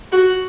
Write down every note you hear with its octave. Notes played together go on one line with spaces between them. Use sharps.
F#4